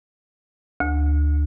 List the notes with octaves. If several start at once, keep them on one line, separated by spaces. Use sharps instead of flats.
D2